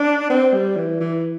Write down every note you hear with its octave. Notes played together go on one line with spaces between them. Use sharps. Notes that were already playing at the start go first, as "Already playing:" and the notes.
Already playing: D4
C4
G3
E3
E3